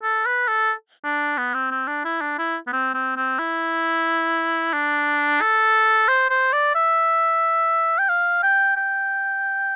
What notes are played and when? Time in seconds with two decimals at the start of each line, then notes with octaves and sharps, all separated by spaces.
0.03 A4
0.26 B4
0.48 A4
1.04 D4
1.38 B3
1.54 C4
1.71 C4
1.87 D4
2.05 E4
2.21 D4
2.39 E4
2.67 B3
2.73 C4
2.94 C4
3.17 C4
3.39 E4
4.73 D4
5.41 A4
6.08 C5
6.30 C5
6.52 D5
6.75 E5
7.98 G5
8.09 F5
8.43 G5
8.77 G5